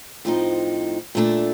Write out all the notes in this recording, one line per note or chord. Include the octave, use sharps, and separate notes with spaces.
A2 F3 C4 D#4
A#2 A3 D4